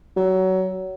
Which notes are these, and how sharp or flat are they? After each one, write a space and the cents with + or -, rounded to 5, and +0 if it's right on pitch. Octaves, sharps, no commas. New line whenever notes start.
F#3 +25